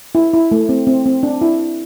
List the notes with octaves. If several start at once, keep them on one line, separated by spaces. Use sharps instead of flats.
E4
E4
A3
C4
C4
C4
D4
E4